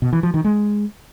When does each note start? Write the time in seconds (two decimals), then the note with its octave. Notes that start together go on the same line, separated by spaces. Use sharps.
0.02 B2
0.13 E3
0.23 F3
0.34 D#3
0.44 G#3